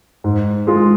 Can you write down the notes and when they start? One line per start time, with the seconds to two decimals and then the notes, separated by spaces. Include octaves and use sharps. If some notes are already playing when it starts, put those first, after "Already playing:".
0.24 G#2
0.67 G#3 F4 G#4